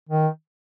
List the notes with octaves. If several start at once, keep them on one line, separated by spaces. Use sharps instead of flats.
D#3